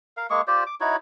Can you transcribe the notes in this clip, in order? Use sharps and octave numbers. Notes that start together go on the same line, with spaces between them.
A#4 F5
G#3 A#3 G#4 C#6
F4 G4 C5 D5
D6
D#4 E4 F#4 C#5